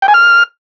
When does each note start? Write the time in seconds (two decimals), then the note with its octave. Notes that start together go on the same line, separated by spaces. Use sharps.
0.02 G5
0.08 G#5
0.14 F6